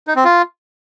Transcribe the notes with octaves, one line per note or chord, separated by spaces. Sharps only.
D#4
C4
F4